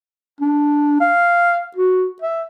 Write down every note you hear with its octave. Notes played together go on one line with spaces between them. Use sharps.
D4
F5
F#4
E5